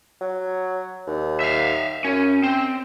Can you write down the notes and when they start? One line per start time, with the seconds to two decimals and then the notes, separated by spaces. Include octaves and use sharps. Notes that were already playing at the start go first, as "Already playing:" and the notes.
0.21 F#3
1.07 D#2
1.40 E5 F5
2.05 F#2 C#4
2.44 C4